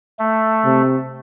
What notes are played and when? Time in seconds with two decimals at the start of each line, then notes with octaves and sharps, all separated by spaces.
0.19 A3
0.65 C3